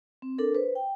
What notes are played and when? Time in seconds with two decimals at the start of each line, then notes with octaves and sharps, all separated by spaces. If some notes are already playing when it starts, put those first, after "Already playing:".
0.22 C4
0.38 D4 A4 A#4
0.55 B4 C5
0.75 G5